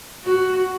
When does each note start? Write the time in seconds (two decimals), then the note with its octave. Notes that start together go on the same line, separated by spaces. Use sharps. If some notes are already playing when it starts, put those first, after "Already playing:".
0.24 F#4